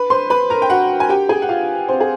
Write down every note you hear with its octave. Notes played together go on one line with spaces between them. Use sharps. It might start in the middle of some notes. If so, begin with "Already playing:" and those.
Already playing: B4 B5
C5 C6
B4 B5
A#4 A#5
G5
F#4 F#5
G#5
G4 G5
G#4 G#5
F#5
F4 F5
C4 C5
G#4